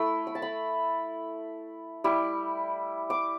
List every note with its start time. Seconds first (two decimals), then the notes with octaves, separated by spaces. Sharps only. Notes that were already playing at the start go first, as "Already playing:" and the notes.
Already playing: A3 E4 E6
0.27 B5
0.35 A5
0.42 B5
2.04 G3 E4
3.10 D6